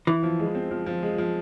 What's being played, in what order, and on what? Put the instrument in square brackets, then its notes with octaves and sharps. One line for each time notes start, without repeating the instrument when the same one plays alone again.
[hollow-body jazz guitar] E3 [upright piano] E4
[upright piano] F3
G#3
C4
F3
F3
G#3
F3